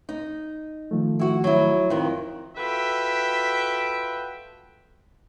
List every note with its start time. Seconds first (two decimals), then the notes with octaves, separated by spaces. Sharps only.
0.09 D#4
0.91 D#3 F3 A3
1.19 E4 F#4
1.44 F#3 E4
1.90 F2 D#3 E4
2.57 F4 F#4 A4 B4 E5 G5